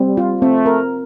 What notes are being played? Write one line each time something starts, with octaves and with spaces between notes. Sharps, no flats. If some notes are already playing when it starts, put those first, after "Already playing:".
Already playing: G3 C4
F4
A3 C4
A#4